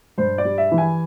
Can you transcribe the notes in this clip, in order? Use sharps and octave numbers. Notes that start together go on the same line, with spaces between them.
G2 C5
D5
G3
E5
E3
G#5